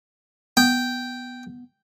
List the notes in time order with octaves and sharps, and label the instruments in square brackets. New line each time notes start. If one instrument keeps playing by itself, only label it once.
[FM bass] B3 [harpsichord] G5